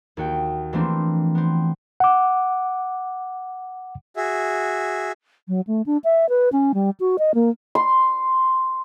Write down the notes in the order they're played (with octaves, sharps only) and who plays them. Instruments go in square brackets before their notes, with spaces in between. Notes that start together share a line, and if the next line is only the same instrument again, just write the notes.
[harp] D#2 F#4 G5
E3 F3 A3 A#3 C4 D4
B3 C4
[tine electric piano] F#5 D6
[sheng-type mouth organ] F#4 G#4 E5
[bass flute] F#3
A3
D4
E5
B4
C#4
G3
F#4
D#5
A#3
[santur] C6